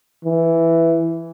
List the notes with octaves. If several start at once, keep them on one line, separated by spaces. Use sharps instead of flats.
E3